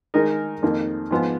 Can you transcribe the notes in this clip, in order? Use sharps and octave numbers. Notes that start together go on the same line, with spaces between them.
D#3 G#3 D#4 A#4 D#5
F2 D#3 A#3
G#2 F3 B3 F4